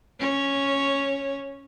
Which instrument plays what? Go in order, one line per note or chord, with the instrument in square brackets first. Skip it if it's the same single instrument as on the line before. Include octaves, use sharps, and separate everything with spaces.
[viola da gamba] C#4 C#5